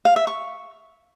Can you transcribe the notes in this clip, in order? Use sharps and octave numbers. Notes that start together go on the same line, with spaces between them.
F5
E5
C#6